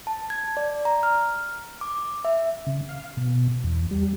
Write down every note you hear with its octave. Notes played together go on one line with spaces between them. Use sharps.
A5
G#6
D5
A#5
F6
D6
E5
C#3
F5
B2
E2
G3